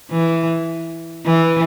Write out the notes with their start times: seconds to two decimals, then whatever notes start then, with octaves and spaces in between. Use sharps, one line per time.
0.11 E3
1.26 E3